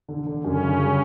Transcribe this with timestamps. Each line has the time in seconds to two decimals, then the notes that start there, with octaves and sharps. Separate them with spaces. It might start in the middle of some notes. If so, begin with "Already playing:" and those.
0.09 D3
0.27 D3
0.44 F#2 C#3 C#4
0.62 D3
0.79 G3